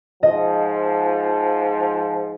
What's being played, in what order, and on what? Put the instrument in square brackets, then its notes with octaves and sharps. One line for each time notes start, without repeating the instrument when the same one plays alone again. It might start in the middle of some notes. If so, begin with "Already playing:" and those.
[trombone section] G#2 F3 [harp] D#5